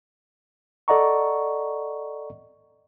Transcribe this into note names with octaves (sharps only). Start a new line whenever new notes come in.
A4 D5 D#5 F#5 A#5 C#6